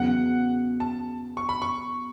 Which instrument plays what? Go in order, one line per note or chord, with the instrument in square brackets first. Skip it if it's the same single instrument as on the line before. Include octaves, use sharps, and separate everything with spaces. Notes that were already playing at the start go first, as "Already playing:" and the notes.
Already playing: [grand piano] E2 C#3 F#3 B3 [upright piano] F#5
[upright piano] A5
C#6
B5
C#6